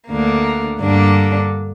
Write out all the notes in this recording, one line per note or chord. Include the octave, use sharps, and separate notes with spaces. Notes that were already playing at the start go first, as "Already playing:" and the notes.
D2 D3 A#3
G2 D3 A#3 D4